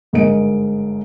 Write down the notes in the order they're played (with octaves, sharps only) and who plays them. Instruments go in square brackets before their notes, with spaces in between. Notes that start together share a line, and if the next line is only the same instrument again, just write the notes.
[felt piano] G1 G#2 G#3 A#4 D#5 D7